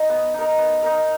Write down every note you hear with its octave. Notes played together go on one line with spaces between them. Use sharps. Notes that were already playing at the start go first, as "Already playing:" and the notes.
Already playing: D#4 D#5
B3
D#4 A#4
B3
D#4 A#4